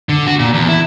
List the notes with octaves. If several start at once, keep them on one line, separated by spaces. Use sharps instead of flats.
D3
F#4
A#2
E2
E4